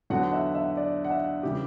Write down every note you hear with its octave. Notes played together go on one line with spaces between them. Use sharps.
E2 D3 F#3 F#5
E5
E5
D5
F#5
E5
C#3 E3 G3 G4